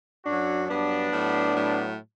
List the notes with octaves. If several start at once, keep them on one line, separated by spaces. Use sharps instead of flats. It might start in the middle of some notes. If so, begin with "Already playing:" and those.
F#2 F#3 D4 F#4
G2 F#3 B3 D4
A2 F#3
A2 F#3